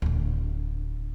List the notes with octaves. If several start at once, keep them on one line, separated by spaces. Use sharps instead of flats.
D1 D3